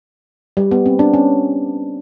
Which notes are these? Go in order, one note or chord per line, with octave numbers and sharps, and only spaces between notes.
G3
B3
C4
D4
C#4